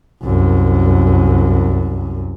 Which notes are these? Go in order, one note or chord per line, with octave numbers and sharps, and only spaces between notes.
C2 F#2